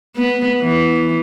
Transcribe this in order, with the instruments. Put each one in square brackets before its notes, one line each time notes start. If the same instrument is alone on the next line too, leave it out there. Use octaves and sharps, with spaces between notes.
[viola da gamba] B3
E3